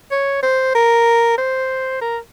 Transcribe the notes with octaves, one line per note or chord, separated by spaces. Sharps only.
C#5
C5
A#4
C5
A#4